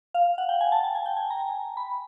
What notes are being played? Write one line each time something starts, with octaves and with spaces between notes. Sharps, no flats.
F5
F#5
G5
G#5
A5
A5
G#5
G5
G#5
A#5
B5